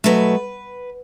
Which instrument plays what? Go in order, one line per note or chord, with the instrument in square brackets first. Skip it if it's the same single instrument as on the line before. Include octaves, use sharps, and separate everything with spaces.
[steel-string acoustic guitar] B2 F#3 A3 B4